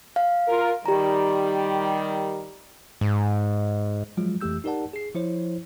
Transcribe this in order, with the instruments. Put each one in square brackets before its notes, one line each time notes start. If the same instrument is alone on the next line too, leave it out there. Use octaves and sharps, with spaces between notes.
[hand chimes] F5
[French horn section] F4 A#4
[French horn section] D#3 G3 [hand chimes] G4 A#5
[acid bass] G#2
[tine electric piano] F3 F#3 G#3 F4
F2 E3 A3 G4 E6 G6
D#4 G4 A#4 D5 F#5 A5
G#4 C7
F3 E4 C5 C#5